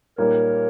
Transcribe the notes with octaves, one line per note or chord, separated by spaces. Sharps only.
A#2 G3 A#3 D#4 A#4 C#5